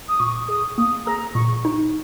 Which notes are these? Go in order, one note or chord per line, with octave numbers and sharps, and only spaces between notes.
D#6
A#2 C#6
G#4 D#6
A#3 D#6
G#4 A#5
A#2 C#6
D#4